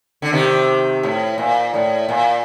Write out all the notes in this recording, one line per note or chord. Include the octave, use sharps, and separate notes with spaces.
D3
C3 D#3
A2
A#2
A2
A#2